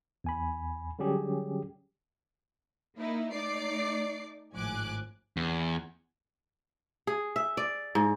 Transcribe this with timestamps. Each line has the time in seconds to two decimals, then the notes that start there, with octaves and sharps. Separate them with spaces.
0.24 E2 G#5 B5
0.99 D3 F#3 G3 C#4 G4 G#4
2.98 A#3 D#4 E4
3.32 A3 D#4 D5 D6 C7
4.54 G#1 A2 F3 G#5 D6 F#6
5.37 E2
7.07 G#4
7.36 E5
7.57 D5
7.95 G#2